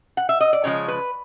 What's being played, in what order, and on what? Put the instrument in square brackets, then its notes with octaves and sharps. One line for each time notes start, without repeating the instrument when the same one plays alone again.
[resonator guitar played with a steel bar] F#5
E5
D#5
D5
C#3 F3 G#3 C#5
B4